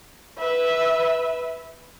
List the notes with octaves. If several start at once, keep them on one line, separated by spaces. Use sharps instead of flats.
B4 E5